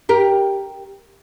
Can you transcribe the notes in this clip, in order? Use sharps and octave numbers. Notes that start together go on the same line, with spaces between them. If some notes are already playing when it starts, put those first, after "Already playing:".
G4 A#4